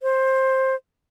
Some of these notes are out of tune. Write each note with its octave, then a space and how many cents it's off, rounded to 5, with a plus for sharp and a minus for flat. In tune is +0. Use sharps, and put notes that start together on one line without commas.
C5 +15